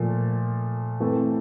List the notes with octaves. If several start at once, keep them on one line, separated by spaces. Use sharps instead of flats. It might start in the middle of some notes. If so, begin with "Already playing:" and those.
Already playing: A#2 F3 A3
E3 A3 C4